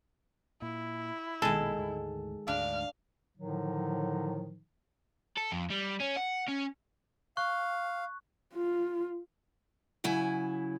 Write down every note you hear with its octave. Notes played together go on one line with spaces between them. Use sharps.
A#2 E4
A#1 B2 D#3 G#3 A4
D2 G#2
D2 G#2 D4 F5
A2 D3 D#3 F3 F#3 D#4
A4
F2
G3
C#4
F#5
C#4
F5 C#6 F#6
F4
C#3 F#3 E4 G#5